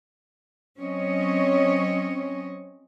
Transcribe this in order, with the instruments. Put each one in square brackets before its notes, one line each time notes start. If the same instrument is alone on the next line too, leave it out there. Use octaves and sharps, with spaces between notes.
[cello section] F#3 C4 C#4 C#5 D#5